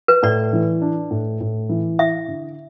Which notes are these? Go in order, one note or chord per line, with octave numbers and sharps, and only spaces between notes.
B4
A2 D5
E3
D4
A2
A2
E3
E4 E5
D3